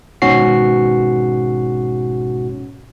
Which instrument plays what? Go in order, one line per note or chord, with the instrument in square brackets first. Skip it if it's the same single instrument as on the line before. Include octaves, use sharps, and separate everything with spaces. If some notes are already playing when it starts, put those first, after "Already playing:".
[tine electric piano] G#1 G#2 B2 C#4 F#4 C7